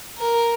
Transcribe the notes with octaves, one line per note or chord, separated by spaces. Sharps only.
A#4